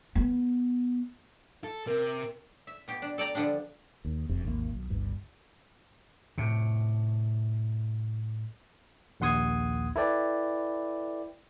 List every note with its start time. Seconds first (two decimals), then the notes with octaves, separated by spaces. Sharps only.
0.16 B3
1.64 A4
1.87 C3 A#4
2.67 E5
2.88 B2 G4
3.02 D4
3.18 A4 D5 G5 A#5
3.35 D3 F3 G3 D4
4.05 D#2
4.29 F1 F2 C3
4.44 G#1 D#2 B2 A#3
4.72 B1
4.90 G1 C#2 G2
6.38 A2 C3
9.20 A#1 D#2 F#5 C6 D#6 G#6
9.96 E4 A4 B4 D5 G5